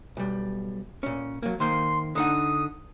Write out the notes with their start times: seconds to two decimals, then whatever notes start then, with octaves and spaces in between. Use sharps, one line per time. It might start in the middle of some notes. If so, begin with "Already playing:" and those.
0.17 B1 G3
1.03 A#2 C#4
1.42 F#3 A#3
1.60 D#3 A#3 C5 C6
2.15 D3 D#4 F#5 D#6